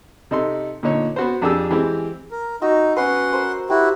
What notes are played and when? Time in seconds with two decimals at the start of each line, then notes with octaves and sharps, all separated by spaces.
0.31 C3 D#4 A4 C6
0.83 A#2 D3 D#4 C#5
1.16 B3 F#4 C5
1.42 F2 D4 G4 G#4 E6
1.71 E3 G#3 C4 G4
2.31 A#4
2.62 D#4 F#4 D#5 E6
2.97 B3 C#4 B4 F#5 C6
3.33 A#4 C5
3.70 E4 F#4 G4